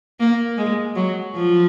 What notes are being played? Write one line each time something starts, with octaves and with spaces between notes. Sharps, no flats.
A#3
G#3
F#3
F3